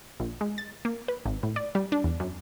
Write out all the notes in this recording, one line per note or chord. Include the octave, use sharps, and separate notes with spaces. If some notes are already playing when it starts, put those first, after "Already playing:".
A#1
G#3
A6
A#3
B4
G#1
A2
D5
G3
D4
E2
F#2